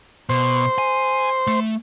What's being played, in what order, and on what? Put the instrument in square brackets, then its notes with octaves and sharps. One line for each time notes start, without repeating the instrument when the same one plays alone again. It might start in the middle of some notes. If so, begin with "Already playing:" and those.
[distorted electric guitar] B2 [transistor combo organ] C5
[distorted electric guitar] G#5
A3